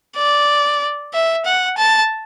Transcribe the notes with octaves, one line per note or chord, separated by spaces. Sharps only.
D5
E5
F#5
A5